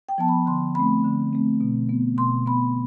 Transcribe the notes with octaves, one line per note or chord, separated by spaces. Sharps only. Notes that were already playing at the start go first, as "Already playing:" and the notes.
G5
F3 B3 A5
B5
D3 C6
A3 C4 B5
D3
A3 C4
B2
B3
B2 C6
B3 B5